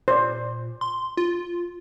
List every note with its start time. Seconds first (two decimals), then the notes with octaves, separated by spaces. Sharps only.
0.08 A#2 C5 D5
0.81 C6
1.17 F4